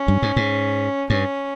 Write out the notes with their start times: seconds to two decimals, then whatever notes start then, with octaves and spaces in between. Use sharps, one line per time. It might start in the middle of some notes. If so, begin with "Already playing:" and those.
Already playing: C#4
0.08 G2
0.22 G#2
0.36 G#2
1.09 G2 C#4